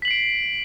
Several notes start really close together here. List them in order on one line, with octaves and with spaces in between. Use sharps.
B6 F#7 C7 D7